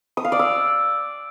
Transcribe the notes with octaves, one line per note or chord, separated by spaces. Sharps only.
D#6
F5
D5
E6